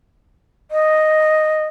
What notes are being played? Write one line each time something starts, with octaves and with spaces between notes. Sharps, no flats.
D#5